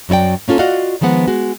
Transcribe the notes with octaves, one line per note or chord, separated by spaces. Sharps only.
F#2 F#3 E4 D5 G5
A#3 C#4 F4 A4
F4 F#4 D5 D#5 F5 F#5
D#3 F3 G#3 B3 F#5
G#3 F#4